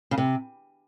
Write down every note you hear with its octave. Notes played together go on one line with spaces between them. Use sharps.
C#3
C3